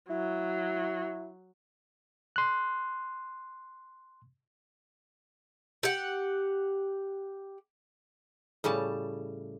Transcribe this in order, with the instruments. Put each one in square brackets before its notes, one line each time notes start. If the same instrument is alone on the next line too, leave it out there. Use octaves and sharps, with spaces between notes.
[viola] F#3 [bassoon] E4
[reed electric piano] C6 F#6
[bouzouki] G4 F#5
[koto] A2 C#3 G3 A5